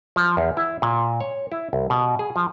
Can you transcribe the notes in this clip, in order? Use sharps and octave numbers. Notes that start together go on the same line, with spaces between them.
F3
E2
E4
A#2
C#5
E4
C2
B2
G#4
F3